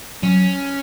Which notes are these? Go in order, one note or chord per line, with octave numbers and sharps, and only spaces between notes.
F#3 C#4